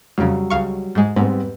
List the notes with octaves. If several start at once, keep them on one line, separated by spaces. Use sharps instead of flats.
F2 C#3 F#3 G3
C#2 F5 C#6
G#2 G#3
G#2 G3 B3 C4